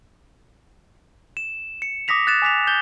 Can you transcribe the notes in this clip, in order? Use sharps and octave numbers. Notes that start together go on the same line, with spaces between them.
E7
C#7
D6 D#6 A#6 B6 F7
F#6 A6 E7
G#5 D6 B6 F7
G6 A6 G7